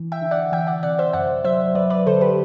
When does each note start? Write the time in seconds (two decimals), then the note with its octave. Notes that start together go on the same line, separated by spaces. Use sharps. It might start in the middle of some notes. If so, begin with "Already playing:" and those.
Already playing: E3
0.12 E5 G5
0.22 D3
0.31 D5 F#5
0.52 E3 E5 G5
0.67 D5 F#5
0.83 C3 D5 F#5
0.99 C5 E5
1.13 F#2 D5 F#5
1.44 F#3 C5 E5
1.75 F#3 B4 D5
1.90 B4 D5
2.06 D3 A4 C5
2.21 G4 B4